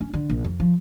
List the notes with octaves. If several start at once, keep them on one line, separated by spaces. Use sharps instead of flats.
C#4
D3
A#1
F2
F3